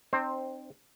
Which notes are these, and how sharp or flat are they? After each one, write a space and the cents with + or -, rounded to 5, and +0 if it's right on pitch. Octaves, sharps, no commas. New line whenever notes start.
C4 +0 D#4 -45 C5 +10